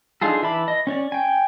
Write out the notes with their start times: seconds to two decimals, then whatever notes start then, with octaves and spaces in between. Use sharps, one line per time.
0.22 D4 D#4 F4 G#4 A4
0.42 E3 E5 A5 B5 D6
0.68 D#5
0.87 C#4 C#5 D5
1.12 G5 G#5